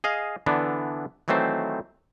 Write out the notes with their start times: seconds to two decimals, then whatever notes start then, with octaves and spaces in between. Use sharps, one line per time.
0.04 G#4 D#5 F5
0.46 D3 E3 B3 D4
1.28 D#3 E3 F#3 A3 C4 C5